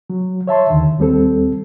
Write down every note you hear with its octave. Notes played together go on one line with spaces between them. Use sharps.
F#3
C#5 E5 A5 C6
D#2 D3 D#3
D#2 G3 C4 A4